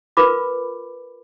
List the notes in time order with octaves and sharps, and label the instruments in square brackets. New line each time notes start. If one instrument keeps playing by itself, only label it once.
[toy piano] F4 A#4 B4 B5 D6